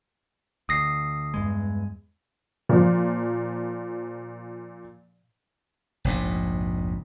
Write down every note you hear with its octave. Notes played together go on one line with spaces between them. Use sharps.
D2 D#6 A#6 C7
E2 G2 G#3
A#2 F3
F1 A#1 G#2